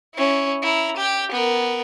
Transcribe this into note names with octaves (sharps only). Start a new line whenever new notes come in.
C#4 E4
E4 A#5
G4 G5
B3 A#4